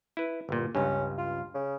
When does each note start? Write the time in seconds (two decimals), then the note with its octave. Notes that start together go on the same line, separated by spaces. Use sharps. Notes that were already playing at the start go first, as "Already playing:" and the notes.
0.17 E4 B4
0.49 G1 A#2
0.75 C#2 G2 C#4
1.18 F4
1.54 C#3